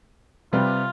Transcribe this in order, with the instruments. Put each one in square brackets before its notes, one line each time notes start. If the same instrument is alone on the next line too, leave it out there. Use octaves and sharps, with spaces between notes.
[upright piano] C3 G3 C4 G4 B4 [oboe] F4